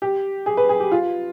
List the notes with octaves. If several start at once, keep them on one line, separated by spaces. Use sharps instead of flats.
G4
G#4
B4
G#4
G4
F4